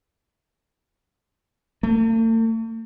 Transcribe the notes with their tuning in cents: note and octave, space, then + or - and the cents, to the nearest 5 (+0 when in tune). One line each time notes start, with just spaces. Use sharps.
A3 +45